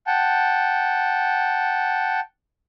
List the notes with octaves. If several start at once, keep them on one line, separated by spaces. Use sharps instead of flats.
F#5 G5 A5